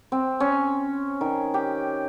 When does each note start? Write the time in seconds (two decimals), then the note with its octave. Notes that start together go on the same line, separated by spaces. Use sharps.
0.12 C4
0.40 C#4
1.21 D#3
1.54 G4